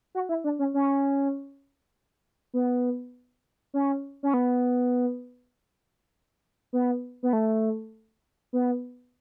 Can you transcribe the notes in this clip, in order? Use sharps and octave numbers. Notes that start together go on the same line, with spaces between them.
F#4
E4
D4
C#4
C#4
B3
C#4
C#4
B3
B3
B3
A3
B3